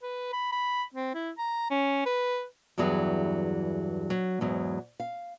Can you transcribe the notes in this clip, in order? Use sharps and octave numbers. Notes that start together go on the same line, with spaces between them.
B4
B5
B5
C4
E4
A#5
C#4
B4
E2 G2 E3 F#3 G#4
F#3
E2 G#2 F#3
F5